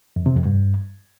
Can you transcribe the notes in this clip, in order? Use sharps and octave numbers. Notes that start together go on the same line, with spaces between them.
F2
C3
F2
G2